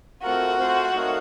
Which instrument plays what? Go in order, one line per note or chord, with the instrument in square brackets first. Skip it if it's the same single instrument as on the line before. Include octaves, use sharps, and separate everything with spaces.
[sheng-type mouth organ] A3 C4 F4 A#4 [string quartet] F#4
[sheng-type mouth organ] A3 C4 F4 C5 F5
A3 D#4 A#4 C#5 F5